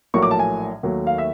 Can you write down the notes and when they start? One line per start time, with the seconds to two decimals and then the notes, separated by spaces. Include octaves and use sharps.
0.14 A#1 A2 F#3 A#3 C#6
0.23 D6
0.31 A5
0.39 G#5
0.83 D#2 D#3 F#3 A3
1.07 F5
1.18 E5